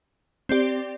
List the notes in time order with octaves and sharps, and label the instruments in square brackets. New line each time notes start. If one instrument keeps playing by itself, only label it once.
[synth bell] C4 G4 D5